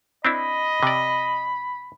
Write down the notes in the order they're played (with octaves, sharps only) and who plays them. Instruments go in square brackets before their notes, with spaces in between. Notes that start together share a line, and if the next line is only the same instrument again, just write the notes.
[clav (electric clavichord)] C4 D4 E4 [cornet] D#5 [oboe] B5
[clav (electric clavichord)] C3 D5